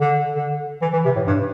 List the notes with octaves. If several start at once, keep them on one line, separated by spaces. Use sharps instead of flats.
D3
D3
E3
E3
C3
A2
G2